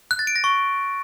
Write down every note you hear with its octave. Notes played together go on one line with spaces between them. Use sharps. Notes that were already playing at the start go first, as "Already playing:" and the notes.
F#6
A6
D7
A#6
C#6